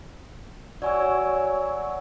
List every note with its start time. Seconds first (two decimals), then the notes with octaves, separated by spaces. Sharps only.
0.82 F#3 C#5 D5 G#5 E6